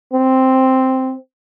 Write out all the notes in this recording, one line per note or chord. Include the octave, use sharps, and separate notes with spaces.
C4